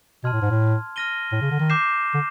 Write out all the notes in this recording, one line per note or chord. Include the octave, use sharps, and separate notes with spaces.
B2 A5 C6 F6 G#6
A2
G#2
A2
F6 A#6 D#7 G7
A2
C#3
D3
D#3
D6 G6 C7 E7
D3